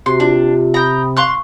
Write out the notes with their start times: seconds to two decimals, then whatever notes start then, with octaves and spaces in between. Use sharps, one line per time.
0.06 C3 F#4 C6
0.20 D4 F4
0.74 G5 A#5 B5 D#6
1.17 F5 C6 C#6 F#6